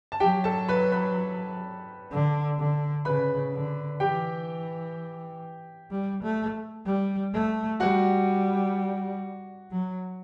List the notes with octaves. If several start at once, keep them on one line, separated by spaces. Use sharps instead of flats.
A5
F#3 G4 G5
A4 A5
B4 B5
B4 B5
D3
D3
C#3 B4 B5
D3
E3 G4 G5
G3
A3
G3
A3
G3 F#4 F#5
F#3